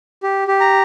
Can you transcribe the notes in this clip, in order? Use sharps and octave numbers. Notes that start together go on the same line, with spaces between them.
G4
G4
A#5